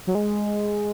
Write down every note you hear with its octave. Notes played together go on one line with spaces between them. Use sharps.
F#3
G#3